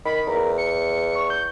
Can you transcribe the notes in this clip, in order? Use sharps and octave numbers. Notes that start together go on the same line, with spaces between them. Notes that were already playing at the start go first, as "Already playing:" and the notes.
D#3 B5
E2 A#4
C#7
C#6
G6